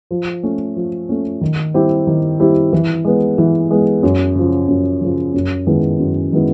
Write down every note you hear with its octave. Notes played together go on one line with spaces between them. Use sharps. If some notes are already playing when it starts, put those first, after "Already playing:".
F3
A3 C#4
F3
A3 C#4
D#3
G3 C4 E4 G4
D#3
G3 C4 E4 G4
E3
G#3 B3
E3
G#3 B3
F#2
C#3 F3
F#2
C#3 F3
F#2
D#3 G#3 B3 E4
F#2
D#3 G#3 B3 E4